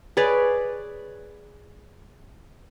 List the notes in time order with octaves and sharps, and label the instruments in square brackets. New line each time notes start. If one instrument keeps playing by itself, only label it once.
[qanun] G#4 B4 C#5 D5